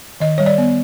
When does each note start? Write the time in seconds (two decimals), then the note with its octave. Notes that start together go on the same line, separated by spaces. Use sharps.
0.20 D#3 D#5
0.38 G3 C#5
0.46 D5
0.58 B3